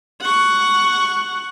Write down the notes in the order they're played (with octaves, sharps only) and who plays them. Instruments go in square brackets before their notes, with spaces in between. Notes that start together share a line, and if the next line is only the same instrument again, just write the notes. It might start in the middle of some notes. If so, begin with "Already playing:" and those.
[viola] F#5 C#6